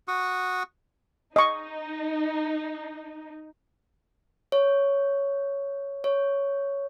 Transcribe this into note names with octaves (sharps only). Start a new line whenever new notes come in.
F#4 C#6 D#6
D#4 D#5 C#6
C#5
C#5